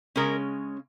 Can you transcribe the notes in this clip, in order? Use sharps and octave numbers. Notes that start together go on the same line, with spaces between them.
C#3 G#3 C#4 A#4